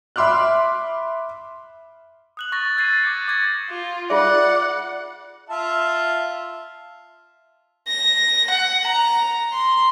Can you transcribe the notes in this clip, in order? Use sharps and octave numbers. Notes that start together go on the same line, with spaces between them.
E5 B5 C6 D6 F6 F#6
D#6 F#6 F#7
C#6 A6 A#6
E6 G#6 A6 C7 D#7
D6 G6 C#7
D6 G#6 A#6
F4
F4 G#4 D5 E5 F#5
F4 E5 A5
A#6
F#5
A#5
C6